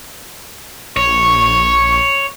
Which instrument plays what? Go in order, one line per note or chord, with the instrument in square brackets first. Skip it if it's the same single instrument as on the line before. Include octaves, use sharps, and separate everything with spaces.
[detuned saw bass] A#1 [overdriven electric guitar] C#5 [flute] C#6